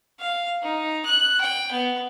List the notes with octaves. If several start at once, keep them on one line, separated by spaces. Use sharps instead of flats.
F5
D#4
F#6
G5
B3